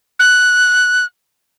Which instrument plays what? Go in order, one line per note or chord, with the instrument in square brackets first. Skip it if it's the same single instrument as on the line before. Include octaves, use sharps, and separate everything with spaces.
[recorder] F#6